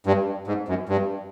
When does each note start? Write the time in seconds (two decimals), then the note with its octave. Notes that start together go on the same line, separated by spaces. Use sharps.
0.06 G2
0.47 G#2
0.68 F#2
0.89 G2